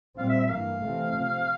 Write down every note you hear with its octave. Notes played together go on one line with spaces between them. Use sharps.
A#2 G3 C4 F5
E5
E5
G2 E3 A#3 F5
C3 E3 A3 C4
C3 F3 C4